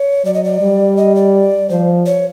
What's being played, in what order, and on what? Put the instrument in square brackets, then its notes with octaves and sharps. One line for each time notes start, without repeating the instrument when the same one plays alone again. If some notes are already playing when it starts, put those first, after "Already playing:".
Already playing: [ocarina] C#5
[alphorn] F#3 [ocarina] D5
[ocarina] D#5
D5
[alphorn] G3
[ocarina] D#5
D5
[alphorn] F3 [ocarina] C5
[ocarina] C#5